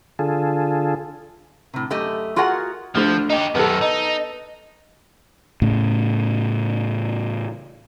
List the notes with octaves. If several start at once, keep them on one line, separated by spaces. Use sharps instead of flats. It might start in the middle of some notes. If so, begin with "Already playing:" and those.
D3 F4 G#4 A4
A2 C3
F#2 A3 G4 D#5
F4 F#4 G#4 A#4 F#5
D2 D3 F3
D#4 G4
F#2 D#3 B3 A4
D#4
A2 C#3